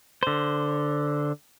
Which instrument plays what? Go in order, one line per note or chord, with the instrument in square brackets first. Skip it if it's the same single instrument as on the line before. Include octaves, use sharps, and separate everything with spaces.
[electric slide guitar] D3 C5